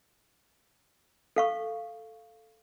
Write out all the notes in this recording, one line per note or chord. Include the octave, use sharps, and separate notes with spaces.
A4 F5 C#6